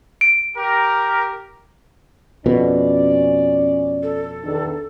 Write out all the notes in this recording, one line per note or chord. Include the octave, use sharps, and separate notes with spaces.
D7
G4 A#4
F2 B2 C#4 D5
A4
E2 D#3 D4